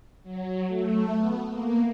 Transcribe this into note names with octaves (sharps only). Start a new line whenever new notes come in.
F#3
A3
B3
A#3